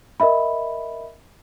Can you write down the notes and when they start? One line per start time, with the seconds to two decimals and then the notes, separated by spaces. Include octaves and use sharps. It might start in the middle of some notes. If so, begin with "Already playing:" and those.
0.20 A#4 D#5 E5 B5